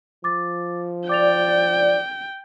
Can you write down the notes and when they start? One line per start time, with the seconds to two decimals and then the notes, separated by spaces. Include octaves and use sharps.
0.24 F3 D6 A6
1.09 D5 G5 D6 A6 F7